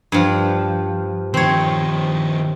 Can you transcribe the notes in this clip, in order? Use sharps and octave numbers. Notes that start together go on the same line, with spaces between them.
G2 F3
D#3 F3 C4 C#5